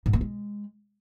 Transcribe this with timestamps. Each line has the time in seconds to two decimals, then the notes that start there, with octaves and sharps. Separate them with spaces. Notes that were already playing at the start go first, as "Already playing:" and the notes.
0.06 G#2
0.13 A3
0.21 G#3